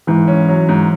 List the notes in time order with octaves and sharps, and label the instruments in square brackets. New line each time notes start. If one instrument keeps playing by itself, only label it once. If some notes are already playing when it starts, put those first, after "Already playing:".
[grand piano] G#2 [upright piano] E3
[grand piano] C#4
F#3
G#2